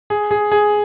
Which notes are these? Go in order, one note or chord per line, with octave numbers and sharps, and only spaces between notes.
G#4
G#4
G#4